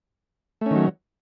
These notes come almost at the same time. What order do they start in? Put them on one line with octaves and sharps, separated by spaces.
A3 C#4 D#3 F#3